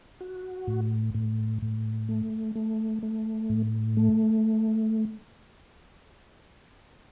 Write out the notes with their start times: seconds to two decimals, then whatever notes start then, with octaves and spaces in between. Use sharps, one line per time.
0.21 F#4
0.67 A2
1.14 A2
1.62 A2
2.09 A3
2.55 A3
3.03 A3
3.50 A2
3.97 A3